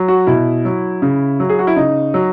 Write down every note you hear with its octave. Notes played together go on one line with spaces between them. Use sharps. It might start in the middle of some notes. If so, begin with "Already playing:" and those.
Already playing: F#3
F#4
B2 E4
F#3
C#3
F#3
G#4
F#4
E4
C#3 D#4
F#3